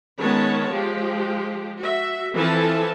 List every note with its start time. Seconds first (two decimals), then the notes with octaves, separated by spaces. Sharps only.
0.19 D#3 G#3 B3 C#4 C#5 A5
0.70 F3 G#3 G4
1.80 F#4 E5
2.34 E3 F3 C4 A4 G#5 A5